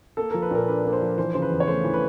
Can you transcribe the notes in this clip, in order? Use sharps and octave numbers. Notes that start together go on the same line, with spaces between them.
A#3 A4
F3 A#4
B4
A#2 A#4
D4 B4
A#3
C5
F3
E3 C5
C#3 C5
B4
E2
C#5
A3 C5
E3
B4